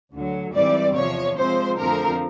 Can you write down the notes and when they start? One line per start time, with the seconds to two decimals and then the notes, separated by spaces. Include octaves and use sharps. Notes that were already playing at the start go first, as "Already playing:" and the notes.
0.13 D2 D3 F#3
0.55 G#2 E3 G3 C4 D5
0.96 E2 C3 F3 C#5
1.37 C3 F3 G#3 C4 C5
1.78 F2 D3 F3 A3 C4 A#4